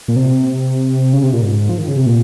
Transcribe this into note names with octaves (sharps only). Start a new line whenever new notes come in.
A#2
C3
C#3
C3
A#2
G#2
F3
D#3
C#3
C3
A#2